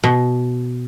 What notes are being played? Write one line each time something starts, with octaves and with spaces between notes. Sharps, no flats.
B2